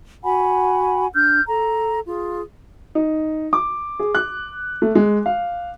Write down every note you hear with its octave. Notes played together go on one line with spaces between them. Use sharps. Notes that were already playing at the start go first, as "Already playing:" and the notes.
F#4 F#5 G#5 B5
D4 F6 G6
A4 A#5
F4 G#4
D#4
D6
G#4
F#6
A3
G#3
F5